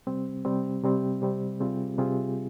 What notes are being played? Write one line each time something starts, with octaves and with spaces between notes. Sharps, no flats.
C3 G3 C4
C3 G3 C4
C3 G3 C4
C3 G3 C4
C3 G3 C4 F4 G#4
C3 G3 C4 F4 G#4